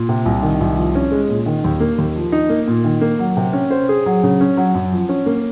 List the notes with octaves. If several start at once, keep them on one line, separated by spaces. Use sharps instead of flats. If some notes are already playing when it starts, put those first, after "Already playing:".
Already playing: A#2
C3
C2
D#3
C2
F3
C#4
G#3
A#2
D#3
D#2
A#3
D#2
F3
D#4
A#3
A#2
D#3
A#3
F#3
C3
C#4
C5
G#4
F#3
C#3
C#4
F#3
F#2
F3
C#4
A#3